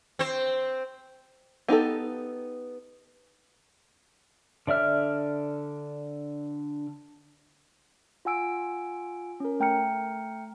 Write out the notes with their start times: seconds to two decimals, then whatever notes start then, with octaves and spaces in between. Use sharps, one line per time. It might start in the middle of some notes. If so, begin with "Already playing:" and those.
0.19 C4 C5
1.68 B3 D#4 G4 A4
4.67 D3 D5 E5 F6
8.25 F4 F#5 G#5 E6 D7
9.40 C#4 A#4
9.60 A3 G5 A#5 F6 C#7